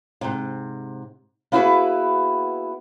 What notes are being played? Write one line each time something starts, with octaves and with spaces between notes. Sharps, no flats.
G#2 C3
A#3 B3 E4 F#4 G#4 B4